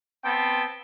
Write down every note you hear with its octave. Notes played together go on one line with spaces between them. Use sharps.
B3 C4 G5 A5